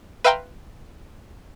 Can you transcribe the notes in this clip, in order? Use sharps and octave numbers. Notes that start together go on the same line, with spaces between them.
B4 E5 F5 G5 A#5 C6